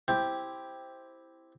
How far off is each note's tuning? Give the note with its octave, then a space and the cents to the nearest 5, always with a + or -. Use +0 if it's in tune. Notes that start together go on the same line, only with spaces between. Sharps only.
C4 +0 E4 +0 G4 +0